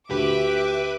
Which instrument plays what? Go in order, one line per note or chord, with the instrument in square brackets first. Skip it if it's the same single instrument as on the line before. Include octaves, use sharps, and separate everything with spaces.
[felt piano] D2 [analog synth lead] G4 [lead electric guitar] B4 [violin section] E5 D6